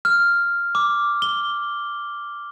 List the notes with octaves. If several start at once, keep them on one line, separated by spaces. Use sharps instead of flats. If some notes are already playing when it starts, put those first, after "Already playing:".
F6
D6
G7